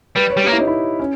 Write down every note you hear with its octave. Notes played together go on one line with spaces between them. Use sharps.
G3 B4
C#5
G3
A#3 G4
E4
D#4
E4
C#4